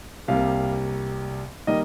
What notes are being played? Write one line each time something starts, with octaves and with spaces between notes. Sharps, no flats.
C2 C3 G3 A#3 F5
D#3 G3 A#3 D#5